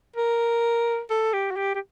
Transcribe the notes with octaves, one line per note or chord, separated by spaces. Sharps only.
A#4
A4
G4
F#4
G4
G4